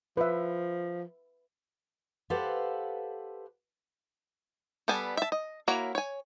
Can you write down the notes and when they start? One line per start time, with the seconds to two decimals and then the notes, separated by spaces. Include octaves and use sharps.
0.17 F3 B4 E5
2.30 G4 A4 B4 C5 F5 F#5
4.88 G3 B3 A4 G#5 A5
5.17 E5 A5
5.32 D#5
5.68 A#3 E4 F#4 C#5 A#5
5.95 C#5 G#5